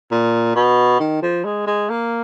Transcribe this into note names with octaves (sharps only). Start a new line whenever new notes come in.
A#2
B2
D#3
F3
G#3
G#3
A#3